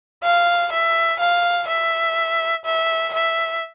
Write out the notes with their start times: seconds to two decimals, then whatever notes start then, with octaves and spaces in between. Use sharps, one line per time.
0.24 F5
0.72 E5
1.20 F5
1.68 E5
2.65 E5
3.13 E5